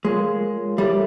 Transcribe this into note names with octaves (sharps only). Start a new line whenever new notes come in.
G#3 F4 A#4 C#5 F5
G3 E4 A4 C#5 E5